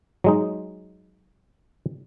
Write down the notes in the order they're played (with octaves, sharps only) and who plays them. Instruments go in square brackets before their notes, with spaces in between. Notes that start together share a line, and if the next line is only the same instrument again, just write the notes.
[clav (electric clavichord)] F#3 G#3 D#4